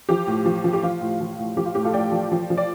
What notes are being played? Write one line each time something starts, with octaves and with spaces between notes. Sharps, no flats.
F3 G4
A2
F3
F3
G4
F3 F4
A2
F3
A2
F3 G4
F4
A2 G4
F4 A4
A2 D5 G5
F3
F3
F3
D5